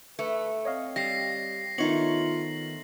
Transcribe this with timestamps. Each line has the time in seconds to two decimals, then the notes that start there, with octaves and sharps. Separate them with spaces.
0.19 A3 B4
0.65 C4 C#5 D#5 F5
0.96 G3 A#6 C7
1.78 D#3 A3 B3 D#4 F4 C#5 F#7